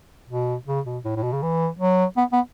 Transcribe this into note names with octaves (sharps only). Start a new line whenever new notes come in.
B2
C#3
B2
A2
A2
B2
C#3
E3
F#3
B3
B3